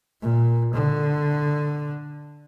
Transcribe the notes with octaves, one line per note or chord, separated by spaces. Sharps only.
A#2
D3